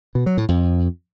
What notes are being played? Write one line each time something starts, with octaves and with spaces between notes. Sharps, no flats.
B2
F#3
A2
F2